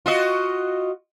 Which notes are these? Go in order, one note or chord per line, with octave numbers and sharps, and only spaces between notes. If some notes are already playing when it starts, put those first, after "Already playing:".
F4 F#4 D#5